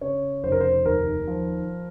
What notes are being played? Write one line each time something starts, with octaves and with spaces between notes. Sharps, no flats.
C#3 C#5
F1 C5
A#4
C5
D#2 A#4
F3